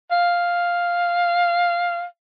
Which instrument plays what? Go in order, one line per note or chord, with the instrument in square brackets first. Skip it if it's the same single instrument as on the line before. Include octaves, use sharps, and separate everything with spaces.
[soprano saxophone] F5